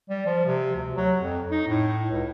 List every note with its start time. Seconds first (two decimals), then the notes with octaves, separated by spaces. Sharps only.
0.10 G3
0.26 F3
0.46 C3
0.76 D2
0.96 F#3
1.20 F2
1.51 D#4
1.68 A2
2.11 C#2